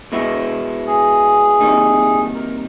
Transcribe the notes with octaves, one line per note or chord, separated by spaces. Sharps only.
B2 G#3 B3 E4
G#4
C3 D#3 G3 A#3 D#4
A#4